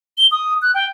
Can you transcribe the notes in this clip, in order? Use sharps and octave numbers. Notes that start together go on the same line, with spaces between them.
G7
D#6
F#6
G5